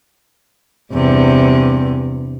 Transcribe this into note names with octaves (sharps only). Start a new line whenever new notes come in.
E2 G2 C3